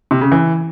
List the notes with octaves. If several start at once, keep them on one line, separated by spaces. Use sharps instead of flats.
C3
C#3
E3